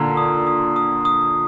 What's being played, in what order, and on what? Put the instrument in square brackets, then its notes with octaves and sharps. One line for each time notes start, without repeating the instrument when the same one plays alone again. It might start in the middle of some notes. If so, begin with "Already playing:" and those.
Already playing: [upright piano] A#2 D3 [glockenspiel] A#5
[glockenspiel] D#6
D#6
D#6
D#6